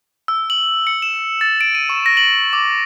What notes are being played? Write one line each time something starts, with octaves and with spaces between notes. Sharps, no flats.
E6
F#7
C#7
E7
A6
D7
D#7
C#6
A#6
F#7
D6